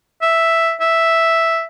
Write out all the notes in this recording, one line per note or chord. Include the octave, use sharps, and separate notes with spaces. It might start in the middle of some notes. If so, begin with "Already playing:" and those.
E5
E5